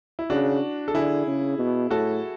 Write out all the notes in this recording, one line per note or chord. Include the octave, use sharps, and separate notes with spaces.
E4
C#3 D4 F#4
A4
D3 E4 G#4
C#3
B2
A2 F#4 A4